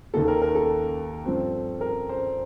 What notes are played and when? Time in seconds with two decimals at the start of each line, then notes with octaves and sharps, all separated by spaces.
0.14 D#2 D#3 A#3 A4
0.28 A#4
0.42 A#4
0.55 A4
1.26 G2 F3 C4
1.81 A#4
2.09 C5